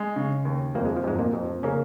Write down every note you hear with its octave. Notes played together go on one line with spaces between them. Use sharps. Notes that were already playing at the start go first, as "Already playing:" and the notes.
Already playing: G#3
C#3
D#2
F2 A#3
G#3
F3
F2 G#2 G#3
A#2 A#3
F2
C#3 A#3 C#4